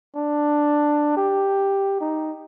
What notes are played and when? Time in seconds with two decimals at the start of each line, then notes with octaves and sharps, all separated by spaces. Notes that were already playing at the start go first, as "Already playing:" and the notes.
0.16 D4
1.17 G4
2.01 D#4